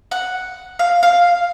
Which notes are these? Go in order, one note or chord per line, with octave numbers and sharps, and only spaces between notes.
F#5
F5
F5